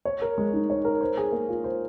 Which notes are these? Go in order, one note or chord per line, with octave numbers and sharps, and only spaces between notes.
C#5
A#4
G#3
D#4
C#5
A#4
C5
G#4
A#3
F4
C5